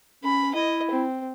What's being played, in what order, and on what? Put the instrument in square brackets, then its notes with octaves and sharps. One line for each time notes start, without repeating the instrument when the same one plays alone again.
[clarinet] C#4 [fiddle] B5
[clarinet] E4 [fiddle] D#5
[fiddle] C4